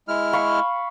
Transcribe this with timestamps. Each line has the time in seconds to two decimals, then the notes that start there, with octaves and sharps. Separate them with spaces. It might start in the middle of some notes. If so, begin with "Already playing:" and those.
0.08 G#3 E4 F6
0.33 F5 B5 C#6